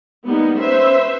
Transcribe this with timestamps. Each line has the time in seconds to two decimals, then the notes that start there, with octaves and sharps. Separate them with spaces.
0.25 G3 A#3 B3 D#4
0.58 C#4 B4 C5 E5